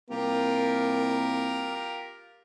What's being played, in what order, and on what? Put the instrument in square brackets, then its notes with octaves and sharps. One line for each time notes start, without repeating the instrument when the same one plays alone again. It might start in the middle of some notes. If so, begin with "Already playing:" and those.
[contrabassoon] C2 [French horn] A#3 [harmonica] F4 G4 A#4